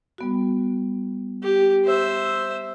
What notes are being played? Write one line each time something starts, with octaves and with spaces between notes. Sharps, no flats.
G3 B3 F#4
G4
C5 E5